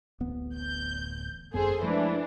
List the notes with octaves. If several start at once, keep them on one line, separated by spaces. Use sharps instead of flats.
D1 A1 B3
G6
G1 F#2 B3 G#4 A4 C5
E3 F3 G#3 A3 D4